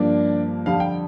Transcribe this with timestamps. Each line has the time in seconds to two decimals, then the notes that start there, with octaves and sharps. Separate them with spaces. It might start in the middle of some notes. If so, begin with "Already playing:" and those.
Already playing: G2 F3 A#3 D4 D5
0.66 F2 D3 G3 F5
0.80 G5